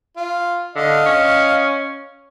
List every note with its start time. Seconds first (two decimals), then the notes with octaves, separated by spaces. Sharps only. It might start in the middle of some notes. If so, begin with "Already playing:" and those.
0.16 F4
0.76 D3 D#5 F5
1.06 C#4